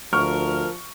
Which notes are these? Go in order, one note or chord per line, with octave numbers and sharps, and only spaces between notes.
D2 F3 A#4 C#6 F6